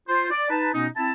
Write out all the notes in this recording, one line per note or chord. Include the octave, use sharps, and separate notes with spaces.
F4 C5
D5
D#4 B4 A5
B2 B3 C#4 D#4
C4 E4 A5